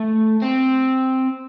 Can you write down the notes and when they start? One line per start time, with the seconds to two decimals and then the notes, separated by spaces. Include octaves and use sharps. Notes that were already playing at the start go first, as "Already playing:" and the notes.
Already playing: A3
0.42 C4